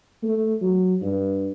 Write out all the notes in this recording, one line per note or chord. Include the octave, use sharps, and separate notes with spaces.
A3
F#3
G2